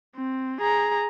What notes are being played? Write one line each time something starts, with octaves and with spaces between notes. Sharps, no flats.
C4
G#4 A#5